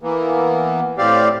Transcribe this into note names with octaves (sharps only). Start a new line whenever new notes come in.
E3 A#3 B3
A2 C4 G4 D5 F5